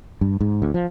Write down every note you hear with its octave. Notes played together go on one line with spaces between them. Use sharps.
G2
G#2
D2
F3